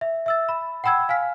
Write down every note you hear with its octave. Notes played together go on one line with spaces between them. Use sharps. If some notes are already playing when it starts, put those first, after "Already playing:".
E5
E5 E6 A6
B5
F#5 G5 B5 E6 G#6
F5 G#5 F6 B6